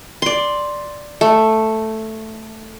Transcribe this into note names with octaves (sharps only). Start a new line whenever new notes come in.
D5 C6
A3